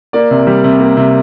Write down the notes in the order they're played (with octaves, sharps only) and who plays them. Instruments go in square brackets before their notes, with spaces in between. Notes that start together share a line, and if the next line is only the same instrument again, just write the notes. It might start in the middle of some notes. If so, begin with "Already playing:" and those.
[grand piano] A#3 D5
C3
G3
C3
A#3
C3